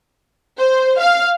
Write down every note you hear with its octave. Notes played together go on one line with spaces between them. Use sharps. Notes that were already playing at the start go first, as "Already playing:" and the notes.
C5
F5